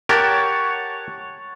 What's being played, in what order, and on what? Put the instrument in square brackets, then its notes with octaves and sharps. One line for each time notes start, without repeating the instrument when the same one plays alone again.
[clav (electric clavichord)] G4 A#4 [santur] C#5 F#5 A5